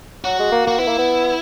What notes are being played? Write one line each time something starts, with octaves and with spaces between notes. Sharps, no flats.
F#3 F#4
G#3
A#3
A#3 F#4
B3 E4
A#3
B3